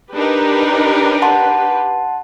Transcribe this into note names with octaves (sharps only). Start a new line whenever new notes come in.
D4 D#4 G4 A#4 B4
F#5 A5 C6